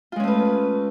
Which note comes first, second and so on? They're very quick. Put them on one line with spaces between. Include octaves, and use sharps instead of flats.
F4 G#3 C#4 A3 B4